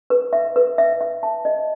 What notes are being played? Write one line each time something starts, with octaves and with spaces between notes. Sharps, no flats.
B4
E5
B4
E5
E5
A5
D#5